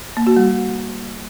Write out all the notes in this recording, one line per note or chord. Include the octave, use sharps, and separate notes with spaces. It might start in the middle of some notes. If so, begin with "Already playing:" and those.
A#3
F#4
G3